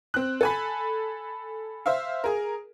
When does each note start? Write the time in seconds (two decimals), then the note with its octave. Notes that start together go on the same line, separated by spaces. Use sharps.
0.14 C4 F#6
0.41 A4 G#5 B5
1.86 C5 E5 F5
2.24 G#4 A#4